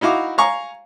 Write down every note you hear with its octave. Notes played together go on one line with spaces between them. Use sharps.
D#4 E4 F#4 F5 D6
F5 G#5 A#5 C#6